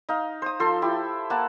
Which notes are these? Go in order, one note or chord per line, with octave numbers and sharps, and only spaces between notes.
D#4 F5
C5 D#6
F3 A4 C6
E4 G4
A#3 F#5 A5